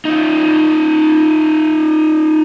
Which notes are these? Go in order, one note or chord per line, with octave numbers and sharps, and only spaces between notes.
D#4 F4